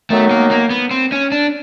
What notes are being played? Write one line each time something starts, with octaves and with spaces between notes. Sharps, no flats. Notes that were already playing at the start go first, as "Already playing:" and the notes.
D#3 F#3 A3 B3 D#4
A#3
A#3
B3
C4
C#4
D4